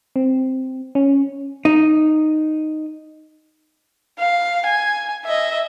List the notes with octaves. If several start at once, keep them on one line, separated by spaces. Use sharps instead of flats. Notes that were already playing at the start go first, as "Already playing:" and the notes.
C4
C#4
D#4
F5
G#5
D#5 E5